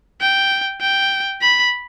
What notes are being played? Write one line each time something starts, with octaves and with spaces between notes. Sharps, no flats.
G5
G5
B5